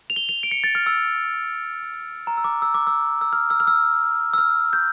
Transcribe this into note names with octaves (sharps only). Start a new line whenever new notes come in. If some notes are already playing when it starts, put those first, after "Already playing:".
F7
G7
F7
D7
C#7
A6
F6
E6
A#5
E6
D6
E6
D6
E6
E6
F6
E6
F6
E6
E6
F6
G6